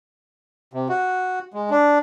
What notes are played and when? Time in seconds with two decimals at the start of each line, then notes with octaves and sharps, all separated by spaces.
0.73 C3
0.89 F#4
1.54 G#3
1.70 D4